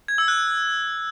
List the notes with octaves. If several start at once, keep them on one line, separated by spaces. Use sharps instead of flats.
G#6
E6
F#6